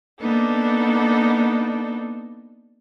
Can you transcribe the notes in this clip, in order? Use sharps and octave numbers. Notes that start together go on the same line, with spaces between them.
A#3 B3 D4 D#4 A4